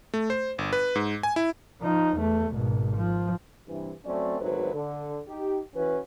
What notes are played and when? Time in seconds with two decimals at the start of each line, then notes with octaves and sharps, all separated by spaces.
0.14 A3
0.30 C5
0.58 G1
0.73 B4
0.95 G#2
1.23 G#5
1.36 E4
1.82 F3 D#4
2.17 E2 A3
2.53 G#1 B2
2.96 F3
3.68 G2 C3 E3
4.05 F#3 A3 C4 C#4 D5
4.39 G#1 D2 F#3 B4 C5
4.74 D3
5.27 D#4 G4
5.74 E3 C#4 E4 F#4 B4